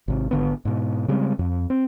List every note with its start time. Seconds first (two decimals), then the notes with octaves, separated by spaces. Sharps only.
0.08 G#1 C3
0.31 G#1 D3 B3
0.65 G#2 B2
1.08 C#3 G3 G#3 C4
1.39 F2
1.70 C4